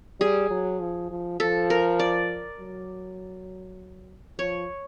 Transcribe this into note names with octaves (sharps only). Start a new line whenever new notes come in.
G3 G#4
F#3
F3
F3
F3 A4
A#4
D5
F#3
F3 C#5